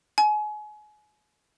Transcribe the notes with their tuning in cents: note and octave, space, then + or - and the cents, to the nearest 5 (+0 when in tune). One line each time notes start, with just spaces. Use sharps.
G#5 +30